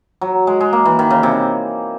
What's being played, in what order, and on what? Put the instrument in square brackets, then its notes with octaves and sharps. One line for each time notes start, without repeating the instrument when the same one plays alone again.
[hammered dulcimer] F#3
G#3
G#3
A#3
E3
D#3
C#3
C3